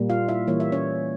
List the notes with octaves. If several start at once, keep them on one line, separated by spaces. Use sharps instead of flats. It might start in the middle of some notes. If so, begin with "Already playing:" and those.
Already playing: A#2 G3 A#3
F4 F5
E4 E5
E3 G3 A#3 C#5
E5
C#4 C#5